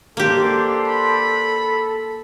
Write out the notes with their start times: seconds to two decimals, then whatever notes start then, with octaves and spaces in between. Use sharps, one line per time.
0.17 A#3 D4 G4 A4 C5 C6
0.87 B5